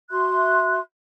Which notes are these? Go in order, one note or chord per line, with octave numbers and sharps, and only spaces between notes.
F#4 E5 C6 F#6